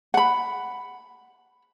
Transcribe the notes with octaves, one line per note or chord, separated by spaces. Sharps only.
F#5 B5